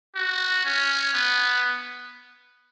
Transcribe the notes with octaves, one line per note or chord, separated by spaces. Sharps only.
F#4
C#4
B3